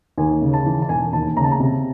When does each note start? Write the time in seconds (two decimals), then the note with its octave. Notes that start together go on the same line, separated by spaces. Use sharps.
0.18 D#2 G#5
0.42 C#3
0.54 A5
0.65 E3
0.82 A5
0.89 E1 G#5
1.12 D#2 A5
1.37 C#3 A#5
1.44 A5
1.51 A#5
1.60 C3